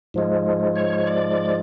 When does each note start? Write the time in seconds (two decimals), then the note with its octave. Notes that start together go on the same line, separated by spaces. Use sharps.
0.14 G#2 F3 G#3
0.76 C#5
1.07 D5